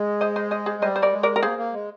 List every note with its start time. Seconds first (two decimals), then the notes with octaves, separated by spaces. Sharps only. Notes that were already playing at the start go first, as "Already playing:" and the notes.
Already playing: G#3
0.21 C5 D#5
0.36 C5 D#5
0.51 C5 D#5
0.66 G#4 C5
0.82 G3 C5 D#5
0.96 C5
1.02 A#4 D5
1.13 G#3
1.23 A#4 D5
1.36 A#4
1.43 A#3 G#4 C5
1.58 A#3
1.74 G#3